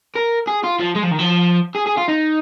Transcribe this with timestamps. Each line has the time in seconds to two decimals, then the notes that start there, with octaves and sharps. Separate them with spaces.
0.16 A#4
0.48 G#4
0.64 F4
0.80 F3
0.96 G#3
1.03 F3
1.11 D#3
1.19 F3
1.76 G#4
1.87 G#4
1.98 F4
2.09 D#4